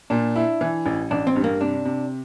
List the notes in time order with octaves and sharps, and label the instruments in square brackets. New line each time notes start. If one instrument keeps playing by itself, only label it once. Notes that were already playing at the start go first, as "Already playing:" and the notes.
[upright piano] A#2 [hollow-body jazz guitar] D4
[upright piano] E4
E3
A1
[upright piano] A1 [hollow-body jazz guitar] D4
[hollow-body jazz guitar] C4
[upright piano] G2
[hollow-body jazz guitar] A#3
[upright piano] C3 [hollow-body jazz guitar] D4
[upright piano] C3